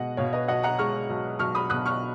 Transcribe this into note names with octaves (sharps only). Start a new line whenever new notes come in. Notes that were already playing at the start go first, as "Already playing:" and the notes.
Already playing: B2 G#3 D#5 F#5
B2 C#5 F5
B4 D#5
B1 D#5 F#5
F#5 A#5
G#3 C#6 F6
B1
B1 C#6 F6
B5 D#6
B2 D#6 F#6
C#6 F6